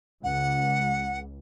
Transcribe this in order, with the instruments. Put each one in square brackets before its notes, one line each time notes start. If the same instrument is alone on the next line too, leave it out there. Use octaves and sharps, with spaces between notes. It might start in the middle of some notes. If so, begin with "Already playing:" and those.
[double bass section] C#2 [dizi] F#5